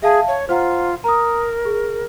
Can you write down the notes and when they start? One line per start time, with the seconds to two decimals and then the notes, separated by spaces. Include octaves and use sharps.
0.03 G#4 E5 F5 A5
0.28 C#5
0.49 F4 C5 F#5 A#5
1.04 A#4 A#5 D#6
1.65 G#4